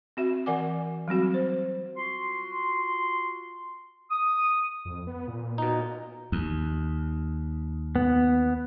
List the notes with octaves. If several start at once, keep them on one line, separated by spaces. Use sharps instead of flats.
C4 F#4 E5
E3 A#4 D5 F#5 G#5 D6
F#3 G3 C4 F#4
C5
F4 F#4 C6
D#6
F2
B3
A#2
B2 D#4
D#2
B3